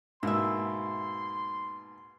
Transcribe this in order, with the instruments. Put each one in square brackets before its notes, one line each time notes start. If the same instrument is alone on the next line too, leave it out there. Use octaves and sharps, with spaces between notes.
[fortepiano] G#2 B2 A#3 [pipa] E4 E5 [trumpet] C6